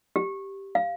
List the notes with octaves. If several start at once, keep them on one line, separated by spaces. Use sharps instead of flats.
G4
F5